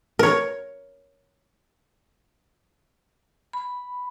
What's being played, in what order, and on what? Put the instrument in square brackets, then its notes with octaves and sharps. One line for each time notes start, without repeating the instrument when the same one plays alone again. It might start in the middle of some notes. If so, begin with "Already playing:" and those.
[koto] A#4 C#5
[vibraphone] B5